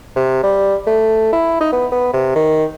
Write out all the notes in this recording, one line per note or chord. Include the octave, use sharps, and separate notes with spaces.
C3
G3
A3
E4
D#4
B3
B3
C3
D#3